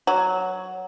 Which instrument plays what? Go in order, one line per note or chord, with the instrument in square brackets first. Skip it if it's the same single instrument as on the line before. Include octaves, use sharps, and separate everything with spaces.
[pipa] F#3